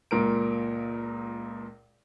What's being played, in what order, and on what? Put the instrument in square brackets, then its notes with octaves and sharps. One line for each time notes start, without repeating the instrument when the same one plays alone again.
[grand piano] C#2 A#2 A#4 D7